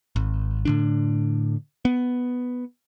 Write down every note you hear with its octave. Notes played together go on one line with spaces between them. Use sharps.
G#1
A2 D3 D4
B3